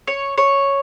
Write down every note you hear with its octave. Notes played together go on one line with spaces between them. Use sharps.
C#5
C#5